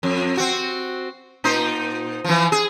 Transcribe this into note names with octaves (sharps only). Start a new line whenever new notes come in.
F2
C4 F#4
A#2 D#4 C5
E3 F3
G#4